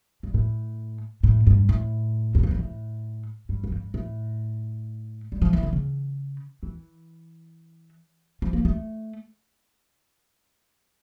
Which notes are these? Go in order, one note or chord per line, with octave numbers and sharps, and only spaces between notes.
G2
A2
A2
G2
A2
E2
F2
G2
A2
G2
F2
G2
A2
G3
F3
E3
D3
C#3
E3
F3
A#3
A3